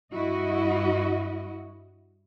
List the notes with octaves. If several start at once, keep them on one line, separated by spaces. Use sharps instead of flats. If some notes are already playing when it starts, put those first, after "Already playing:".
G2 E4 F#4 D#5